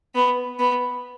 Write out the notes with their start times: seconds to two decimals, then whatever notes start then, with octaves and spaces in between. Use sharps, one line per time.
0.15 B3
0.59 B3